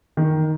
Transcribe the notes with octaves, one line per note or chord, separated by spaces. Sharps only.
D#3